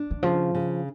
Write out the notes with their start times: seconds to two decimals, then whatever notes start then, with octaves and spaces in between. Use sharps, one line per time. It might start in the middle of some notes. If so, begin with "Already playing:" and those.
Already playing: D4
0.11 D3
0.23 C#3 F3
0.55 C#3